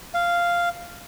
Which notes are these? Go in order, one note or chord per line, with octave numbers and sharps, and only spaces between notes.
F5